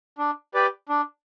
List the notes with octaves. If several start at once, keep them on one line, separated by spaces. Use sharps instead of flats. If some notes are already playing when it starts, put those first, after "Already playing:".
D4
G4 B4 D5 G5
D4